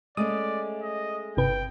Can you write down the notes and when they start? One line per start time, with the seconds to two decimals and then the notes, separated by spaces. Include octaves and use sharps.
0.17 G#3 A3 C#4 D5 D#6
0.82 D#5
1.37 G1 C3 B4 G5